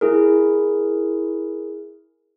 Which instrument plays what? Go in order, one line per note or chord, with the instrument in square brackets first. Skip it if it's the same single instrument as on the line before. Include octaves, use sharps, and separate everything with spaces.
[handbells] E4 G#4 A#4